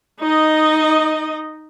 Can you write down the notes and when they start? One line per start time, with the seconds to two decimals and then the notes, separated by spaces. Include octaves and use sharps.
0.21 D#4 D#5